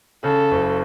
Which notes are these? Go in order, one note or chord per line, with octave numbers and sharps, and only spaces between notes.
C#3 A4
F#1